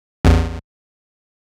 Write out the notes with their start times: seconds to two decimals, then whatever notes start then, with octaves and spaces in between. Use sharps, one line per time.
0.25 A1 E2